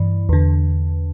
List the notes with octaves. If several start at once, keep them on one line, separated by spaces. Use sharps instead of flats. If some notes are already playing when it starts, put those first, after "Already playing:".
Already playing: G2 E3
E2 D3